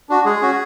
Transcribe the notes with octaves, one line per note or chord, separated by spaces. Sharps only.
D4 F#4
G#3 G#4
C#4 F#4